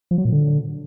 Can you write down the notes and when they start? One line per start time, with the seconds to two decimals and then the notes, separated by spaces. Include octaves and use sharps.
0.11 F3
0.18 F#3
0.25 A#2
0.32 D3